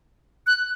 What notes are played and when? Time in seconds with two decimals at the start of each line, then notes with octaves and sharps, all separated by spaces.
0.47 F#6